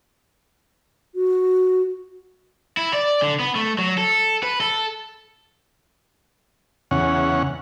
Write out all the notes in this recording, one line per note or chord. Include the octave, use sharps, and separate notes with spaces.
F#4
E4
D5
D3
B3
A3
F#3
A4
B4
A4
E2 C#3 C#4 F#5